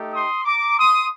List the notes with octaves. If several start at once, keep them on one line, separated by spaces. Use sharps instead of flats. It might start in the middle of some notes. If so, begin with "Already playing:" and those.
Already playing: A3 D#4 G4
C6 D#6
A#5 D6
C6 D#6